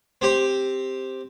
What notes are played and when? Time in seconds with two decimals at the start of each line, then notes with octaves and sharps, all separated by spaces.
0.21 C4 G4 C5